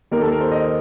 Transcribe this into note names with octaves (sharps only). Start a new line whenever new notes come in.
D#2 D#3 A#4
A4
A#4
C5
D#5